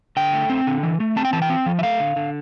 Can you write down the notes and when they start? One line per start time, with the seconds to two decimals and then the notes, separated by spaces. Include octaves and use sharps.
0.17 D3 G5
0.33 A3
0.50 C4
0.67 D3
0.83 E3
1.00 A3
1.16 C4 A5
1.25 G5
1.33 E3 A5
1.42 G5
1.50 C4
1.66 F3
1.79 E5
1.83 A3 F5
2.00 D3
2.16 D3